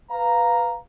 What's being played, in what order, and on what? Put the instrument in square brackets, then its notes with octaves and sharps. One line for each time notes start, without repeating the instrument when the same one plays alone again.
[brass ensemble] B4 F5 A#5